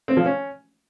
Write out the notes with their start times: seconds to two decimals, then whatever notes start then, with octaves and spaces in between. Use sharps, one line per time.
0.08 C4
0.17 F3
0.25 C#4